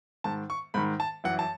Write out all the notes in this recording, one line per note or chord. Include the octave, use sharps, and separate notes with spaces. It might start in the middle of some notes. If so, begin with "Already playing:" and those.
G#2 D#3 A5
C#6
G#2 D#3 B5
A5
F#2 E3 F#5
A5